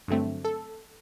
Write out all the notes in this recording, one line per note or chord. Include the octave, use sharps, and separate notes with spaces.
G2 D3 F#3 A3 C4
A4